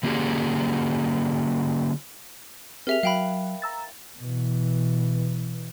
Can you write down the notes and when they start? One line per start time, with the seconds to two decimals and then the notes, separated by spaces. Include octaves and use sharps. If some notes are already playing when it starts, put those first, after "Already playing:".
0.03 D3 A#3 C#4 G4 G#4
2.87 C4 G4 G#4 A#4 E5 F7
3.03 F#3 F5 G5 B5
3.62 A#5 E6 A6
4.19 B2 E3